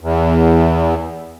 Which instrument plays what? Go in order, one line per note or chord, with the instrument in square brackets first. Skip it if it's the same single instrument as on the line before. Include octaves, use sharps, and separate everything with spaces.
[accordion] E2